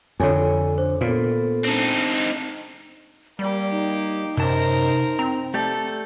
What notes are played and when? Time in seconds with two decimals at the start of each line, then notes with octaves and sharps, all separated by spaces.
0.20 F2 D3 A4 C#5 G#5
0.78 D4 C5
1.01 A#2 B3 A4
1.65 C4 D4 D#4 A5
3.39 G3 A#3 G4 D5
3.71 D#4
4.37 F#2 C3 A#4 C5 A5
5.19 C4 A#5
5.54 A3 G4 A4 D5